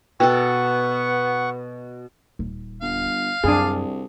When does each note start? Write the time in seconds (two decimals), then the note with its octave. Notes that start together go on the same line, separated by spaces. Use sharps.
0.20 B2 B3 A4 F#5 G5 C#6
2.39 D#1
2.82 G1 F5
3.44 C2 F#2 D4 G#4